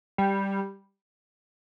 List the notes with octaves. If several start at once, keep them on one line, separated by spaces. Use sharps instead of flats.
G3